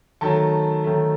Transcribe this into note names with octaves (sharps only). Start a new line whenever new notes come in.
D#3 F#3 A3 A4 A5
D#3 F#3 A3